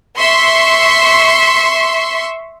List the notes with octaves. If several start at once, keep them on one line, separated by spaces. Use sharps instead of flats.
E5 C6 C#6